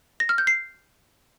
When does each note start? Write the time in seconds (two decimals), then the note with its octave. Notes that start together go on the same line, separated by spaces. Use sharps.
0.20 A#6
0.29 F6
0.38 G6
0.47 C7